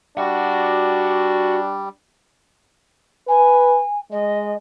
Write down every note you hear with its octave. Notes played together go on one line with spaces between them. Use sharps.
G3 D4 F#4 F#5
B4 G#5
G#3 D#5